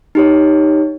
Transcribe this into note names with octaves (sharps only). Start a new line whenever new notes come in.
D#4 G4 C#5